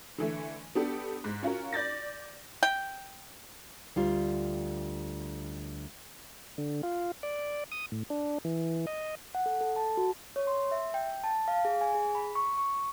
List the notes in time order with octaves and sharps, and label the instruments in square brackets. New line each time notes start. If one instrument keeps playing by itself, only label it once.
[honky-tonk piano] D3 E3 A3
B3 D4 G4 A4
G#2
C#4 F4 F#4 A#4
D5 G6 A6 A#6
[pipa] G5
[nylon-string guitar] D2 G3 F4
[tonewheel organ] D3
F4
D5
D#6
A2
D4
E3
D#5
[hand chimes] F#5
A4
A4
A5
F#4
C#5
C6
E5
G5
A5
F5
G#4
G#5
G#4
B5
C#6
C#6